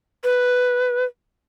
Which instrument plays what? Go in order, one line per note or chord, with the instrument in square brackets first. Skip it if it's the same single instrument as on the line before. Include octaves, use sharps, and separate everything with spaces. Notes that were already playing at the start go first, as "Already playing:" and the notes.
[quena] B4